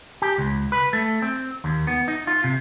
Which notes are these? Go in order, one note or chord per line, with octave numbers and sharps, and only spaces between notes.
G4
C#2
B4
A3
C4
D#2
B3
D#4
F4
C3